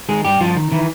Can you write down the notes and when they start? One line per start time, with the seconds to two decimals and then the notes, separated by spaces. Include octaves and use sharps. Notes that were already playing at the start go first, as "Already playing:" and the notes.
0.09 D#3 G#3 G#4
0.25 G2 G3 G4
0.40 G2 F3 F4
0.56 D#3
0.72 D#3 E3 E4